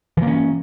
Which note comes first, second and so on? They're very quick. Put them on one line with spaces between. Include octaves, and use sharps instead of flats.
E3 A#3 C#4